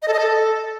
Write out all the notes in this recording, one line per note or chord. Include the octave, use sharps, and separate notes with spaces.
D#5
A4
D#5
A4